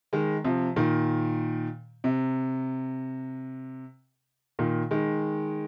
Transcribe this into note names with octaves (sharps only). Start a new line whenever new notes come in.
D#3 G#3
C3 F3
A#2 D#3
C3
A#2 D#3
D#3 G#3